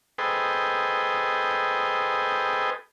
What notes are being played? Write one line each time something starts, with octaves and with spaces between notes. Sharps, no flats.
G#4 A4 B4 C5 D#5 G5